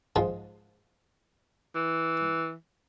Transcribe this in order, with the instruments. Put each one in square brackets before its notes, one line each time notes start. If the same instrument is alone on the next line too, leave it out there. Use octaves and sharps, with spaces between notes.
[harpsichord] G#2 F3 G#3
[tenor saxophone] E3